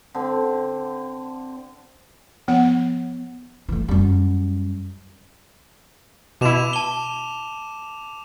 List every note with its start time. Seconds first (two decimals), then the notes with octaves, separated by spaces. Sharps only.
0.15 D3 C4
2.48 F3 B3 F#5
3.69 E3 A3
3.88 F#2 G3
6.41 B2 E4 D6 E7 F7
6.73 A5 G7